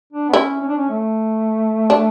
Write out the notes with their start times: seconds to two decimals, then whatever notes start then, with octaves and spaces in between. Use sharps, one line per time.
0.13 D4
0.29 B3
0.33 C#4 E4
0.61 C#4
0.68 D4
0.77 C#4
0.90 A3
1.90 D4